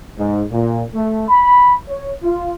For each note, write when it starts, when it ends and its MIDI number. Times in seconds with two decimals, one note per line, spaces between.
0.18 0.44 44
0.52 0.84 46
0.94 1.29 57
1.29 1.73 83
1.89 2.11 73
2.23 2.54 65